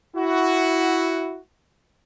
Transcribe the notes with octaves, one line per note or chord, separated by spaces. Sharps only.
E4 F#4